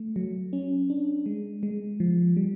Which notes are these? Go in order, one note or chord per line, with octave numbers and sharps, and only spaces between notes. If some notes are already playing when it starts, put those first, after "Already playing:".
Already playing: A3
F#3
C#4
D4
G#3
G#3
F3
G3